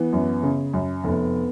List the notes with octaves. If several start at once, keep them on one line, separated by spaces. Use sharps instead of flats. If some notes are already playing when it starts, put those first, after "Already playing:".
Already playing: E3 B3
F#2
C#3
F#2
F1 B3